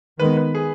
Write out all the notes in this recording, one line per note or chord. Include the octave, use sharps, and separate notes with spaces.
D#3 G#3 B3 B4
B4
G#4